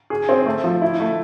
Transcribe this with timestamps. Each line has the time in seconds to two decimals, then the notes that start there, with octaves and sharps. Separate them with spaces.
0.10 G#4
0.29 C4
0.46 A3
0.64 F3
0.82 E4
1.00 A3